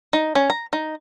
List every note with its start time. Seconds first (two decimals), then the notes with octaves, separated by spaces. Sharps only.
0.13 D#4
0.35 C#4
0.50 A#5
0.73 D#4